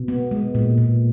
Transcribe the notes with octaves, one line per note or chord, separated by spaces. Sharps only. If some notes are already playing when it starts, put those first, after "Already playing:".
Already playing: B2
B3
G#3
A#2
A#2